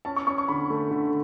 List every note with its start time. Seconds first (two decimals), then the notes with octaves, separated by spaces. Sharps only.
0.05 C#4 A5
0.16 C#6
0.27 C#4 C#6
0.38 C#6
0.48 D3 B5
0.70 A3
0.91 D3